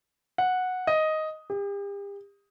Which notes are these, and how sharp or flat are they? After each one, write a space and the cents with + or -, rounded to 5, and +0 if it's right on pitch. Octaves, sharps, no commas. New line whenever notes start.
F#5 -10
D#5 +5
G4 +40